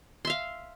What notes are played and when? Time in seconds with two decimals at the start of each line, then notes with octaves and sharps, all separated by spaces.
0.25 C6
0.27 E5
0.30 F5